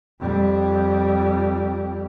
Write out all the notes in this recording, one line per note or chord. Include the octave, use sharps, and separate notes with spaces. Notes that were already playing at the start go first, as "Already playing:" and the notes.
F2 G3